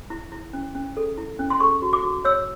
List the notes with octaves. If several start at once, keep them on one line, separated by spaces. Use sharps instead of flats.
E4
E4
C#4
C#4
A4
E4
C#4
C6
A4 C#6
F#4
D6
F#4
C#5 E6